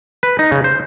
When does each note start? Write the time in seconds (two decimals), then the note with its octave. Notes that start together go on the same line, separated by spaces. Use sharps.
0.23 B4
0.39 D#4
0.52 C#3
0.64 C5